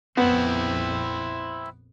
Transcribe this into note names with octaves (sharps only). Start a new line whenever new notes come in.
A#1 F2 B3 C4 E4